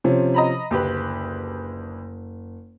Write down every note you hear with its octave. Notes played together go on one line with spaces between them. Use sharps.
C3 F3 C#4
D#5 A#5 B5
F#1 D2 G4 B4